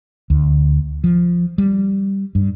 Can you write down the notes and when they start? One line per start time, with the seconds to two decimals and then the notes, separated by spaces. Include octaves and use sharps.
0.30 D2
1.04 F3
1.58 G3
2.35 G2